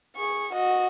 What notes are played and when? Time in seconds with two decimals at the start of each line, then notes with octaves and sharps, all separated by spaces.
0.16 G#4 C#6
0.53 F#4 D#5